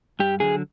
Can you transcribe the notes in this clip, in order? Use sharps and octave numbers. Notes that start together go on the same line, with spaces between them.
G2 G4
D3 F#3 G#4